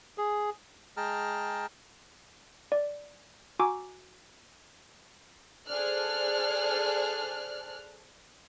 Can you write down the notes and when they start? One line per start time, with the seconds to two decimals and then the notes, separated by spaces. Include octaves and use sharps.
0.18 G#4
0.97 G#3 G#4 G5 A5 A#5 F6
2.72 D5
3.59 F#4 G#5 A#5 D6 E6
5.68 G#4 A4 C5 D5 F6 F#6